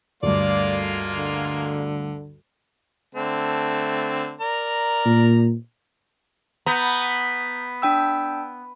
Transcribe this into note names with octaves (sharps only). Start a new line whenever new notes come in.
D2 G2 G#3 A#3 F4 D5
D3
D3 A3 C4
A#4 D5 A#5
A#2
B3 A#5 G6
D4 G5 E6